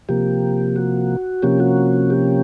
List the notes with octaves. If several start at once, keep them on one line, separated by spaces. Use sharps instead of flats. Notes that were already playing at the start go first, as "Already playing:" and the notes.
C3 F3 A#3 G4
F#4
C3 F3 A#3 C#4 G4
F#4
G4